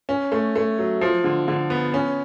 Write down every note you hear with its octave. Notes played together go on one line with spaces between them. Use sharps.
C#4
A3
A3
F#3
F3
D3
D3
B3
C#4